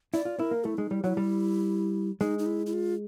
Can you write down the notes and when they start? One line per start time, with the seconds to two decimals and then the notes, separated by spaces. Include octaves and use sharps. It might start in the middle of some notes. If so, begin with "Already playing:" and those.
0.13 E4 D5
0.25 F4
0.39 E4 A#4
0.51 A#3
0.64 A3 E4
0.77 G#3 D#4
0.91 G3 E4
1.04 F#3 E4
1.17 G3
2.21 G#3 D#4
2.39 D#4
2.46 E4
2.66 E4
2.73 F4